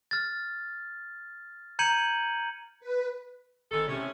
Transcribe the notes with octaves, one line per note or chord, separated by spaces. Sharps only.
F6 A6
A#5 G6 G#6 C#7 D#7 F#7
B4
G#1 D#3 G#3 A4
A2 C3 C#4